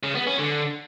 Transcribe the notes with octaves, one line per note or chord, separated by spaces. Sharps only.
C#3
B3
C#4
D3